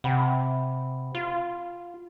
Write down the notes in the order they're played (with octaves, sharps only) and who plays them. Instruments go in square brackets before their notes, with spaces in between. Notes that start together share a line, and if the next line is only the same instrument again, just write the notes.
[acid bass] C3 [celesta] F#5 G5 B5
[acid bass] F4